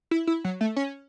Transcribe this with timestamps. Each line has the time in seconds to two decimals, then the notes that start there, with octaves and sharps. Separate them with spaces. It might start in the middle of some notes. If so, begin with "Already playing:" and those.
0.11 E4
0.27 E4
0.44 F#3
0.61 A3
0.76 C#4